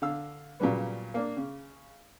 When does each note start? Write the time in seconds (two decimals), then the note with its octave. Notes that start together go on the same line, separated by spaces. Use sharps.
0.02 D3 F5 E6
0.60 A#2 C#3 F#3 G3 B3
1.14 A#3 D4
1.37 C#3